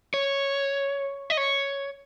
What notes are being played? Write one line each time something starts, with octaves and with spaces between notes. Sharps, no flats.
C#5
D#5
C#5